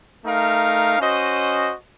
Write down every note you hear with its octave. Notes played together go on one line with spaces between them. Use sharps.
A3 D#4 A#4 F5
C#4 F#4 C5 D#5